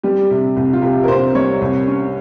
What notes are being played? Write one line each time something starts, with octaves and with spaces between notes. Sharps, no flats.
G3 G4
C3
C2
F4
C3 G4
A#4
C2 C5
G3 C#5
C2
C#4